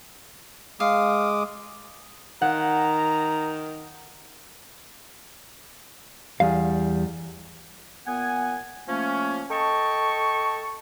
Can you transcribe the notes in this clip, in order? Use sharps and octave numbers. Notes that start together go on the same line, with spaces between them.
G#3 F5 D6 D#6
D#3 F#5 A#5
E2 G3 F5
A#2 B3 F#5 G#5
F3 A3 A#3 C#4
A4 D#5 G5 A5 C#6